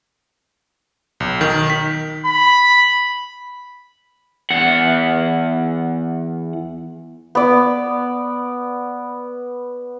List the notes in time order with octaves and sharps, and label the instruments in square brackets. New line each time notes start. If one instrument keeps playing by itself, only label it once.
[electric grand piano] B1
D#3
B6
[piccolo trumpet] B5
[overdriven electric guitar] E2 F#5
[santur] B3 D5